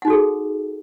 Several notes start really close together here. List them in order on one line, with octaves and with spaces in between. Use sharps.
F#5 D#4 F#4 A4 G#4